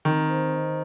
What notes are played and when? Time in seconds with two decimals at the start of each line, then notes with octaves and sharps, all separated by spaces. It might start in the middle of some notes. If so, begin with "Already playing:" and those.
0.05 D#3 C4
0.29 C5
0.54 D#5